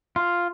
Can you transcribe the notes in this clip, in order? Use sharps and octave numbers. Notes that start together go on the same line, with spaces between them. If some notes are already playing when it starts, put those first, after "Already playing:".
F4